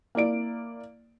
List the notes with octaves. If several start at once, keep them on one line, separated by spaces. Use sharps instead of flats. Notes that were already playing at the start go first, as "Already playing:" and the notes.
A#3 E4 D5 D7